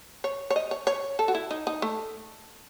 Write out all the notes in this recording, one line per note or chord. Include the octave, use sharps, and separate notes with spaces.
C#5
C#5
D#5
C#5
C#5
A4
F#4
E4
D#4
D#4
A3